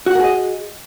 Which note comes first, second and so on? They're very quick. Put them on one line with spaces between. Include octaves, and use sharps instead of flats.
F#4 F#5 A#4 G#4 D#5